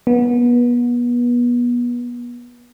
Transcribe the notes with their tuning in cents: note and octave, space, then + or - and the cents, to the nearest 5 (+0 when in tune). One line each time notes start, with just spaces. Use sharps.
B3 -30